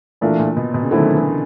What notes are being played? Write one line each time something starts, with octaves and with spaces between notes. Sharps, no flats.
A#2 E3 A3 D4 F4 A#4
A#2
B2
B2
C#3
D3 D#3 F#3 A3 C4 E4
E3